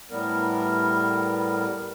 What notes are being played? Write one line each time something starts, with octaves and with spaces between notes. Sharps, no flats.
A2 G3 B3 A#4